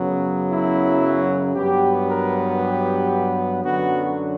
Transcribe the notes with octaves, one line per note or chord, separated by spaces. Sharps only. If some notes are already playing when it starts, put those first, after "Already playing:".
Already playing: F#2 C#3 F#3 B3
E4
G2 F#3 B3 G4
A#4
G4
F#2 D3 F#3 B3 F#4